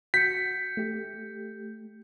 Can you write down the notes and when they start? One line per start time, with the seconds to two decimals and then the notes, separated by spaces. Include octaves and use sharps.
0.14 F#4 G6 B6 C#7
0.77 A3 G4